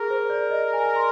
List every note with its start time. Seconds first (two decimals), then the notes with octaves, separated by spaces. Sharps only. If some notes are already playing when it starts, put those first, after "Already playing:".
Already playing: G#4 A#4
0.10 C5
0.30 D5
0.50 D#5
0.73 G#5
0.85 A#5
0.96 C6